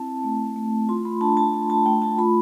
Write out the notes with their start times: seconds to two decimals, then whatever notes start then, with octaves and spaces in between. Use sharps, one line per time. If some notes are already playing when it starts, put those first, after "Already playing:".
Already playing: C4 E4 A5
0.24 A3
0.56 A3
0.89 F4 C6
1.05 B5
1.21 D4 A5
1.37 A5
1.54 A3
1.70 A5
1.86 A3 G5
2.02 A5
2.18 F4 B5